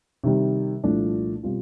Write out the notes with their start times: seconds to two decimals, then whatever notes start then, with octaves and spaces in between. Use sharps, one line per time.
0.24 C3 D#3 G3
0.84 C2 A#2 F3 A3 D4
1.43 B2 G3 C4 F4